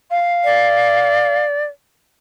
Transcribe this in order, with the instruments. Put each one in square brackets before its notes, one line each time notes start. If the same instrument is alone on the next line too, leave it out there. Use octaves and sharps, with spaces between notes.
[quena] F5
[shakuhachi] D5